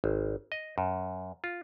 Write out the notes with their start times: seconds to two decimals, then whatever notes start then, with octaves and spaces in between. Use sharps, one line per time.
0.04 G#1
0.52 D#5
0.78 F#2
1.44 F4